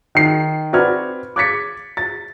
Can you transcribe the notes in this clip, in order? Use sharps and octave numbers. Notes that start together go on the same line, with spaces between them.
D#3 C7
C4 F#4 B4 D5 F6 G#6
D6 F#6 G#6 A6 B6 C#7
A6